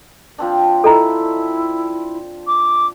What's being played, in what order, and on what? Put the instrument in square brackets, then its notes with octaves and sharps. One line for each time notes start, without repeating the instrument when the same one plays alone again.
[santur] F3 C4 D4
[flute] E4 [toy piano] A4 D#5 A#5
[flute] D6